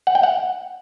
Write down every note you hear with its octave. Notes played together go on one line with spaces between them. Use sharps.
F#5
G5
F#5